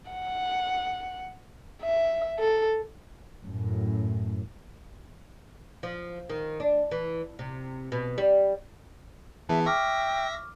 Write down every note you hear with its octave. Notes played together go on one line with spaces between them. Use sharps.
F#5
E5
A4
F#2 A2
F3
D#3
D4
E3
C3
B2
G3
E3 B3 G#4 E5 A5
E5 G5 C#6 D6 F6 A#6